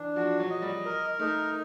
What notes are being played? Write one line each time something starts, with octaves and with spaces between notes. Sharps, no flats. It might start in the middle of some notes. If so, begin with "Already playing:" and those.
Already playing: E3 D4
F3 F#4
F#3
D#5
G3
A#4
A3 D#4